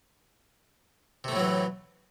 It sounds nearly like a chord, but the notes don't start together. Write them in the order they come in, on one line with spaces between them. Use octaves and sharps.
C3 A3 A2 F#3 E3